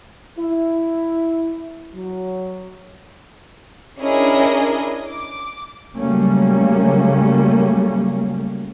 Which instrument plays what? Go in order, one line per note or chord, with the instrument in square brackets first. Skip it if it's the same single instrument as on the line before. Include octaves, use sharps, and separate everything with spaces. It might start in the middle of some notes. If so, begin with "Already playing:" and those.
[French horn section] E4
F#3
[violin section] C#4 D4 E4 G#4 A#4 D#5
D6
[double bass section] C#3 F#3 G3 A3 A#3 C#4